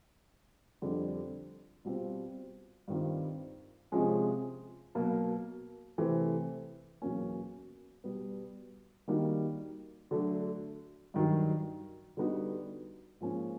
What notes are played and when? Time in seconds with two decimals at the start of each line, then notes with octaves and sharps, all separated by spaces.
0.82 F2 D3 G3
1.85 B2 G3 C4 F4
2.88 G2 D#3 G3 C4 F4
3.92 C3 F3 G#3 C#4
4.95 B2 F#3 A#3
5.98 C3 E3 A3 C4
7.02 E2 B2 F#3 A#3 C#4
8.04 B2 G3 B3
9.08 D#3 G3 A#3 D#4 F#4
10.11 D3 F#3 A3
11.14 G2 D#3 F#3
12.17 D3 G3 B3 D#4 F#4
13.20 G#2 F3 A#3 C#4